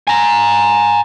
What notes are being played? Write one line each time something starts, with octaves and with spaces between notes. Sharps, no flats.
G#5 A#5